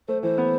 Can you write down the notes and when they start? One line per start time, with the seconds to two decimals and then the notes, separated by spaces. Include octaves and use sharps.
0.08 A3 C5
0.22 E3 C5
0.38 B3